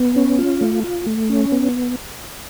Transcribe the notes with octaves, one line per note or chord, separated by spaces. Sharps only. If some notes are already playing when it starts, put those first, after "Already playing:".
Already playing: B3
C#4
F4
A3
F4
A3
C#4
B3